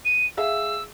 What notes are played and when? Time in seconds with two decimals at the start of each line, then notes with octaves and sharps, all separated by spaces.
0.05 D#7
0.37 G#4 E5 F5 E6